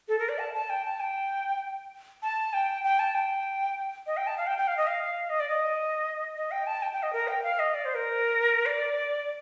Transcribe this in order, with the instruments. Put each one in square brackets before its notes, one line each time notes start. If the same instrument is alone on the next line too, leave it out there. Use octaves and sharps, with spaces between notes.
[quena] A4
A#4
D5
A5
A5
G5
A5
G5
A5
G5
G5
A5
G5
D#5
G5
A5
F5
G5
G5
F5
D#5
F5
D#5
D5
D#5
D#5
G5
A5
G5
G5
D#5
A#4
G5
F5
D#5
D5
C5
A#4
D5